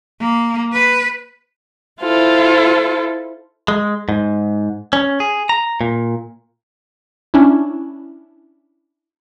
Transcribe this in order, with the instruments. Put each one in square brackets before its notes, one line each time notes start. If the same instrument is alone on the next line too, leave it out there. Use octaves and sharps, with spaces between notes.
[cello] A#3
B4
[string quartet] E4 F4 A4 C5
[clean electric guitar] G#3
G#2
C#4
G#4
A#5
A#2
[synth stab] C#4 D4 E4